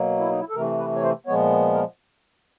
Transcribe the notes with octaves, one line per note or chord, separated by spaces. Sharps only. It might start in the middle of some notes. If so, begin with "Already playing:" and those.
Already playing: B2 F#3 A#3
E4
D#4
E4
A4
C3 E3 A3 A#4
B4
C#5
C5
A#2 F3 G#3 B3 C#5
A#4